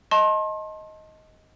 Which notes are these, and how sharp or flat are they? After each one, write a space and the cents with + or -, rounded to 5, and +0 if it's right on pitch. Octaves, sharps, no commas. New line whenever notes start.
D#5 +10 A5 -5 C6 +35